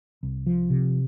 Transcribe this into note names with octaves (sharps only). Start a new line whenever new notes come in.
C2
F3
C3